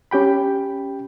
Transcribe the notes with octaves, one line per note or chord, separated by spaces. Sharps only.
C#4 G4 G5 B5